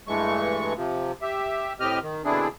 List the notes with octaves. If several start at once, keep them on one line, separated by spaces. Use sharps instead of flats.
G2 E3 G#3 A3 C#6
C3 F3
G4 E5
A2 C4 G4 D#5 F6
D#3
B2 D3 C4 D4 E4 G#4